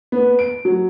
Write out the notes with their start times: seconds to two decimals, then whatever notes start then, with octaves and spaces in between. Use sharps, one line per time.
0.12 B3
0.39 D7
0.65 F#3